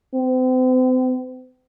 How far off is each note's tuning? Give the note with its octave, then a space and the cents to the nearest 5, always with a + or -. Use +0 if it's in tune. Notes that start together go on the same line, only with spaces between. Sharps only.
C4 -40